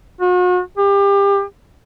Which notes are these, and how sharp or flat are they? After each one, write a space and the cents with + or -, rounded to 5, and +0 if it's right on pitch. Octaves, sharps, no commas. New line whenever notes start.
F#4 -40
G4 +30